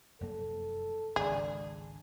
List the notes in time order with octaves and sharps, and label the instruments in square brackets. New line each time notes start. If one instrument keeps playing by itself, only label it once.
[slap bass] F1 F#2 A#3 [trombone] A4
[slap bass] G#1 C#2 [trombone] D4 [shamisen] G#4